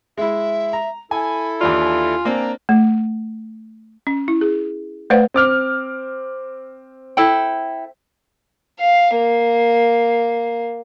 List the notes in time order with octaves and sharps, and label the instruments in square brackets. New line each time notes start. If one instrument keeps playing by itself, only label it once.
[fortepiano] G#3 E4 [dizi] E5
[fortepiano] A#5
[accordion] E4 A4 [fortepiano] G#5 [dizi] B5
[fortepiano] D#2 E3 D4 [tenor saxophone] F4
[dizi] G#5
[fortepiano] A#3 C4 D4 [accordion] A#5
[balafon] A3
C#4
E4
G#4
A3 B4 C5 D5 F5 F#5
[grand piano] C4 D6 F6
[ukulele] E4 A4 G5
[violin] F5
A#3